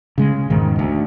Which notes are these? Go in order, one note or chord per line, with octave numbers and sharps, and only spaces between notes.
C#3 G#3
E1 G#2 D#3
D2